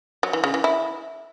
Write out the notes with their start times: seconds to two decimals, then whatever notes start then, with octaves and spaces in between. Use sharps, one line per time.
0.23 F#3
0.33 E3
0.44 C#3
0.54 E3
0.64 E4